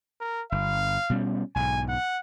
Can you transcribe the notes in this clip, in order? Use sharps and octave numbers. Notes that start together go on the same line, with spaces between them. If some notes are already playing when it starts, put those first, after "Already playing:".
A#4
G1 F5
B2 G3 C#4
B1 G#2 G#5
F#5